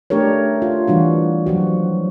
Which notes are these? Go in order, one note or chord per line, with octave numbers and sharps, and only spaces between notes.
A3 D4 G4 A#4 C#5
F4
E3 G3 D4 F#4
F3 F#3 F#4